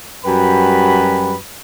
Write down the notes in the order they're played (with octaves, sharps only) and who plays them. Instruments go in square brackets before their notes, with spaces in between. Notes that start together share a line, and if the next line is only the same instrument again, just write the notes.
[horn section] F#2 G3 F#4 B4 G5 B5